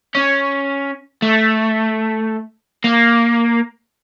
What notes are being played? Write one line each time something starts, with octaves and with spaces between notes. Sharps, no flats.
C#4
A3
A#3